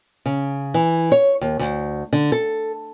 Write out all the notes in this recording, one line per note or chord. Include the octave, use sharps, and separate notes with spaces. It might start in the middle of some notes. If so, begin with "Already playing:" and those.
C#3
E3
C#5
D#2
D2
D3
A4